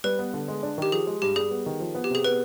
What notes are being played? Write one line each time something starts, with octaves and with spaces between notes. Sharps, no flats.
G3 B4
B3
D3
G#3
D4
D#3 G4
F3 G#4
G#3
G2 G4
G3 G#4
B3
D#3
F3
B3
G4
C3 G#4
B3 B4